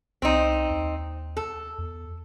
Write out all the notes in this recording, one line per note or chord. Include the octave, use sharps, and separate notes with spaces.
C2 C4 D#4
D#2
A4
E2